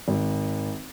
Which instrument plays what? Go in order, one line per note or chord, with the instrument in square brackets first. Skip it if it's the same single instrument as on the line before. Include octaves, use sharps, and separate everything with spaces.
[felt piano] G#1